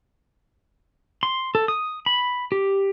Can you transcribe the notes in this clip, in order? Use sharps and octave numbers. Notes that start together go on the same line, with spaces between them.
C6
A4
D#6
B5
G4